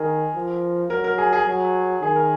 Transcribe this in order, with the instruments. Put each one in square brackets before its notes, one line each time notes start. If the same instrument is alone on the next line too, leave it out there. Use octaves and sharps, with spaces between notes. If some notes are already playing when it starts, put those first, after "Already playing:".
Already playing: [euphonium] D#3 [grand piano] G#4 A#4
[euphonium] F3
[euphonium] F#3 [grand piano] A#4
[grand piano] A#4
G#4
G#4
[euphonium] F#3 [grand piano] G#4
[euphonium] D#3 [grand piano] G#4
[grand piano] A#4